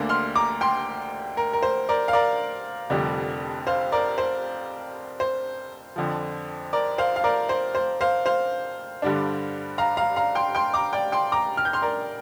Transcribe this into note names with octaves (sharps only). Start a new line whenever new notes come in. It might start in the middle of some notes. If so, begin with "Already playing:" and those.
Already playing: D2 D3 A#3 D4
C6 F6
A#5 D6
G5 C6
A#4
A#4
C5
A#4 D5
F5
A#4 D5
F1 F2 D3 G3 D4
C5 F5
A#4 D5
C5
C5
F2 D3 F3
A#4 D5
C5 F5
F5
A#4 D5
C5
C5
C5 F5
C5 F5
G2 D3 G3 D4
F5 A#5
F5 A#5
F5 A#5
G5 C6
G5 C6
A#5 D6
D5 G5
G5 C6
A#5 D6
F6
G6
C6 F6
A#4 D5